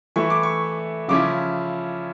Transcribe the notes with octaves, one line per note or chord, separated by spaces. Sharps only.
E3 A3 E4 C#6
D6
C#6
C#3 F3 C#4 E4 D6